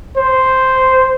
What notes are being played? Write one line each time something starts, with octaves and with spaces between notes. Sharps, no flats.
C5